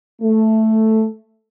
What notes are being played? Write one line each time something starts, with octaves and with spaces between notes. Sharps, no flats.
A3